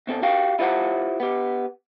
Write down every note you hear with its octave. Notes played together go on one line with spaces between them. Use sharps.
B2 C4 A4
F#4 G4 F5 G5
E4 F4 G4 C5 D5 F#5
B3 G4